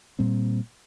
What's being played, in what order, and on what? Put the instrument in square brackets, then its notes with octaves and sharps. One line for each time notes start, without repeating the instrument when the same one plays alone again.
[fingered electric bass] A#2 G3 C4